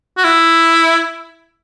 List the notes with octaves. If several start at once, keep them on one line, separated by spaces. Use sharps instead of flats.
F#4
E4